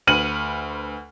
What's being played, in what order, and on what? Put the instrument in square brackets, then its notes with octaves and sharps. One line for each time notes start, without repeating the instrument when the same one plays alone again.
[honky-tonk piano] D2 B4 F6 C#7 D#7 F#7